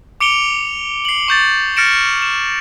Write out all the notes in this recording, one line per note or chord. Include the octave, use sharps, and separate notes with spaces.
D6 C#7 D7 F7 G7
C7 F#7
C#6 G6 A6
F6 A6 A#6 C#7 D7 E7
E7